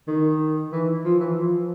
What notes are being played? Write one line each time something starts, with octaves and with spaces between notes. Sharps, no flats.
D#3
E3
F3
E3
F3